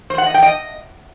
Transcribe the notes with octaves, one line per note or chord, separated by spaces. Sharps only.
C5
F#5
D#5
G5
D#5